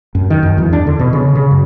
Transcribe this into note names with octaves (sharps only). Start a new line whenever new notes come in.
F#2
D#3
F#2
E2
D4
D3
B2
C#3
C#3
F#2